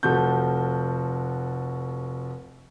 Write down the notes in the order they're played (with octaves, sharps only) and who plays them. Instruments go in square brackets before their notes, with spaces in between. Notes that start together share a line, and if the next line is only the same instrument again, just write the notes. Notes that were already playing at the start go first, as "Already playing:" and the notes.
[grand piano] F1 F3 F#4 A4 G6